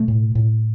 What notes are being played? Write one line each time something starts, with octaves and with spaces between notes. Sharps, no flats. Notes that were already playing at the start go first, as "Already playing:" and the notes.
Already playing: B2 A3
A2
A2